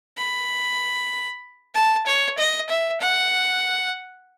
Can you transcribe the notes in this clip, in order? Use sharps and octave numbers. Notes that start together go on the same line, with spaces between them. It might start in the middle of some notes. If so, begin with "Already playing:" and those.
B5
A5
C#5
D#5
E5
F#5